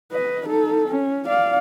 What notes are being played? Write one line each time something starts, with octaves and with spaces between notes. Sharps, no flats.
B4 D#5
D#4 A4
C#4
D5 F5